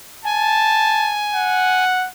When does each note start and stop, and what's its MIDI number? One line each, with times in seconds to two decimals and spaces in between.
0.25 1.85 80
0.25 1.16 81
1.34 2.08 78